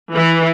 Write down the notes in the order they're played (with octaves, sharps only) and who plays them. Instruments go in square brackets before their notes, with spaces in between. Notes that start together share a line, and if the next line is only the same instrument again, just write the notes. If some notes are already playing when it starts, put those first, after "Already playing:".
[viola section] E3